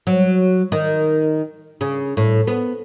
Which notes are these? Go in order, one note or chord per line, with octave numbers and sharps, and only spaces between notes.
F#3
D#3
C#3
A2
B3